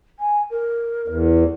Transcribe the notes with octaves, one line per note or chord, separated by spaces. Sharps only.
G#5
A#4
E2